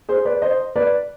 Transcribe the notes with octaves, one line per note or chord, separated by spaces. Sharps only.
G#4 C5
B4 D5
C5 D#5
B4 D5